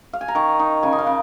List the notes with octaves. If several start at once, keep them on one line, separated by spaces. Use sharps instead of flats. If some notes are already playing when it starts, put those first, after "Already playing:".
F5
G#5
A#5
D#3 C#6
D#4
C#3 G#5
D#5
F5
C#3